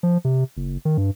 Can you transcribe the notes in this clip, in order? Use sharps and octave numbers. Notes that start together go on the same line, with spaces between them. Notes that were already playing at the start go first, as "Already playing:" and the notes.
F3
C3
F#1
D#3
G2